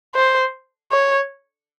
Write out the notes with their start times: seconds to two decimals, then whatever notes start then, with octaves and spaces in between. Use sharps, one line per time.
0.15 C5
0.91 C#5